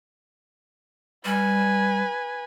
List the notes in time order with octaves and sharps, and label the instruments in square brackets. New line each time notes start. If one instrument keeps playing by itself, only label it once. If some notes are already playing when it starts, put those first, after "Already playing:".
[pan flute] G3 [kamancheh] B4 G#5